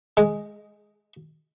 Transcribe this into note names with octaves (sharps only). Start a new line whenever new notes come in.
G#3